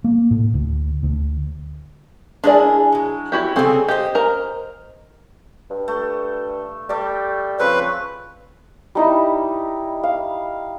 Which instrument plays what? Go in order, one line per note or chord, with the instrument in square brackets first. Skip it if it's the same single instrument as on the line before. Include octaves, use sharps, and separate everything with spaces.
[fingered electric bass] A#3
A2
D2
D2
[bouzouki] G#3 G#4 A#4 [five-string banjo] D4 E4 D5
[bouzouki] F#3 G#3
[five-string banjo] E4 F#4 G4
[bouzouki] C#3 G3 G#4 [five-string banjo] C4 A4
[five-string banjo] G4 [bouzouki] C5 D#5
[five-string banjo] A#4 A#5
[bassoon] G2
[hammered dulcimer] A3
[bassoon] G3 [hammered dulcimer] A3 D6
[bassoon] C#3 [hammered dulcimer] F3 C4 C#6 [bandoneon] B4
[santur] G3 D#4 E4
F5